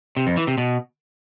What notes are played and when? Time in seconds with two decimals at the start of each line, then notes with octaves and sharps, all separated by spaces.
0.17 C3
0.27 F2
0.37 E3
0.47 C3
0.58 B2